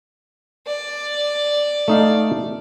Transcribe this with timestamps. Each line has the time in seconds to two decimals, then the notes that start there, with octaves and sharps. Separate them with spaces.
0.67 D5
1.88 A3 D#4 F5